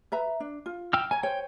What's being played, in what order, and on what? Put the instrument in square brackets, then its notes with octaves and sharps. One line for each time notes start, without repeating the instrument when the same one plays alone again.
[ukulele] B4 E5 A#5
D4
F4
[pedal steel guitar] G5 E6 F6
[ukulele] C#5 A#5 [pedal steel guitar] G#5
[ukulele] C5 C#5 [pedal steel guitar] G5